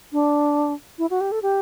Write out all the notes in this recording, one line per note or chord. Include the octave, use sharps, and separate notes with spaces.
D4
E4
F#4
G4
A4
G4